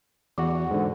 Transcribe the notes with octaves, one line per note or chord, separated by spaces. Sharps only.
E2 E3 F#4
G#2 D3